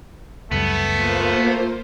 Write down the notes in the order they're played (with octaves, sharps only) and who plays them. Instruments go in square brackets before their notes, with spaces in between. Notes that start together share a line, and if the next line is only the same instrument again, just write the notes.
[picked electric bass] C#2 F#2 G3 [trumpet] A3 [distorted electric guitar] B3
[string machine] A#3 F4 C5